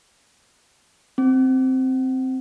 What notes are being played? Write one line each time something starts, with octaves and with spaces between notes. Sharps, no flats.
C4